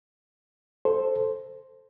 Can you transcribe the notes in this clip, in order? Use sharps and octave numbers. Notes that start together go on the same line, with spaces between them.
A4 C5